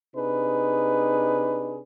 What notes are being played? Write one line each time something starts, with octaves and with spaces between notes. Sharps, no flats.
C3 D4 D#4 G#4 B4